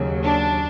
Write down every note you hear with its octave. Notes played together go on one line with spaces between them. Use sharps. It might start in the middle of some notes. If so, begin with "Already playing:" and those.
Already playing: D#2 C#3 F#3
D4